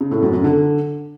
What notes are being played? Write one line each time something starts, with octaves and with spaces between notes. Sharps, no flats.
C#3
A2
F#2
F#2
D3